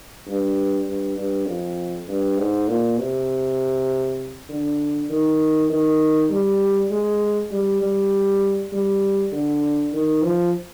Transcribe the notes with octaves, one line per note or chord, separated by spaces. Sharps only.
G2
G2
G2
F2
G2
G#2
A#2
C3
D3
D#3
D#3
G3
G#3
G3
G3
G3
D3
D#3
F3